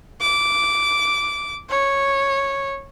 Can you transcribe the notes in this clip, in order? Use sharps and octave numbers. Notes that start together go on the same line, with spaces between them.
D6
C#5